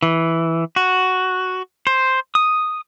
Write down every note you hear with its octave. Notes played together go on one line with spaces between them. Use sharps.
E3
F#4
C5
D#6